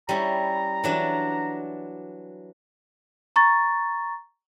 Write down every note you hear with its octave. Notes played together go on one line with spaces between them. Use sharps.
G3 C#4 E4 A#5
E3 F#3 D4
A#5 C#6 A6